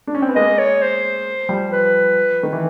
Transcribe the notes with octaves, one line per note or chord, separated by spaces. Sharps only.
D4
C#4
C4
B3
G#3 A#3 D#5
C#5
C5
F3 G3
B4
D#3
E3